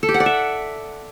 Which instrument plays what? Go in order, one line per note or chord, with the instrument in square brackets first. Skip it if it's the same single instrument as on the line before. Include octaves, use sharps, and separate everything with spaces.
[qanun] A4
G4
F#5
D5
E5